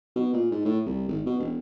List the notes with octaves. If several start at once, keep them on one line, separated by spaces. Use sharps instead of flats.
B2
A#2
G#2
A2
C2
G#1
B2
E1